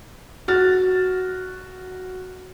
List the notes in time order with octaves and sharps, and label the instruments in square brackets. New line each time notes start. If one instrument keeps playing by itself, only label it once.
[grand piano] F#4 F6 A6